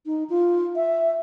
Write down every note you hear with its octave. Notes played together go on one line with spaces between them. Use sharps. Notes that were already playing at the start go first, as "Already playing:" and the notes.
D#4
F4
E5